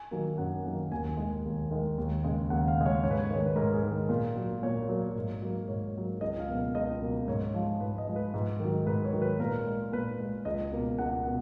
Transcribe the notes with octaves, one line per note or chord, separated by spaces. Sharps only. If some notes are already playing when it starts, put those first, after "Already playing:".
Already playing: G#5
D#3 F#3 A#3
F#2 F#5
D#3 F#3 A#3
D#2 G#5
D#3 G#3
D#2
D#3 G#3
D#2
C#3 G#3
D#2 F#5
F5
C#3 G#3
C#5
G#2 C#5
B4
C#5
D#3 G#3 C#5
B4
G#2 A#4
G#4
D#3 G#3
A#2
F#3 A#3
A#2 C#5
F#3 A#3
G#2
F#3 A#3
G#2 C#5
F#3 A#3
C#2 D#5
F5
B2 F#3 A#3
F5
C#2 D#5
B2 F#3 A#3
G#2 C#5
F3 G#3
G#2 B4
D#5
F3 G#3
B4
G#2
D#3 F#3
G#2 B4
C#5
D#3 F#3
B4
A#2 A#4
G#3
A#2 B4
G#3
C#2 D#5
B2 A#3
C#2 F#5
B2 A#3